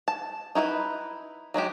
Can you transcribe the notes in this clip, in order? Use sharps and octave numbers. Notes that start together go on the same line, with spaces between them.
A5
D#4 E4 F#4 B4
F#3 G#3 F#4 G4